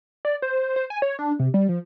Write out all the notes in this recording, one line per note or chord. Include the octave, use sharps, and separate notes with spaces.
D5
C5
C5
G#5
C#5
D4
C3
G3
F3